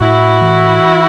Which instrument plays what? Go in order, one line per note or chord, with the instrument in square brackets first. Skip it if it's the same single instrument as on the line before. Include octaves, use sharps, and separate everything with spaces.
[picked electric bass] A2 [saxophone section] E4 F#4
[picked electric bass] E3